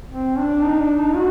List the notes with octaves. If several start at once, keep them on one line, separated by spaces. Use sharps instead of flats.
C4
D4
D#4
D4
D#4
F#4